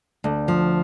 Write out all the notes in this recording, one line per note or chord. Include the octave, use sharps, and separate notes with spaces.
D2
F3